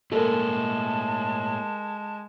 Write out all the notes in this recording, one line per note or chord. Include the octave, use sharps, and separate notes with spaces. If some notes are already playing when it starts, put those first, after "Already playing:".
A2 G#3 A#3 A4 A#4 D#5 A5